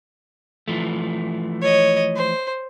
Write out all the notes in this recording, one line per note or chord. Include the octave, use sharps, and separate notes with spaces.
E3 F3 A3
C#5 D#5
C5